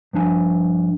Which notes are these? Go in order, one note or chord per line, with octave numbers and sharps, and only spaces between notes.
G2 F3 D4 G#5